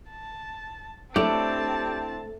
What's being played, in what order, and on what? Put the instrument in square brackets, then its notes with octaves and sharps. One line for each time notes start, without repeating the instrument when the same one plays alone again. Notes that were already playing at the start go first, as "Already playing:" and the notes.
[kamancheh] A5
[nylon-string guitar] A3 [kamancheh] C4 A5 [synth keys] D4 E4 [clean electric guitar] G4 C#5 D5